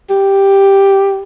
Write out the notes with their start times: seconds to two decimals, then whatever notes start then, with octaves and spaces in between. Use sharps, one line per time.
0.10 G4